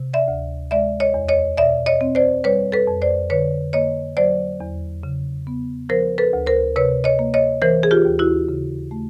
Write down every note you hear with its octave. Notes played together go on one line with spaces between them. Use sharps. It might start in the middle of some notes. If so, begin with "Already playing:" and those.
Already playing: C3
D5 E5
D2
G#3 D5 E5
C#5 D#5
E2
C#5 D#5
B2 D5 E5
C#5 D#5
C4
C5 D5
G3 B4 C#5
A4 B4
F2
C5 D5
D3 B4 C#5
A#3 C#5 D#5
F#3 C5 D5
E2
C#3
B3
F3 A#4 C5
A4 B4
D2
A#4 C5
C3 B4 C#5
C#5 D#5
A#3
C#5 D#5
E3 A#4 C5
G#4
F4 G4
D#2
E4 F#4
C#3
A3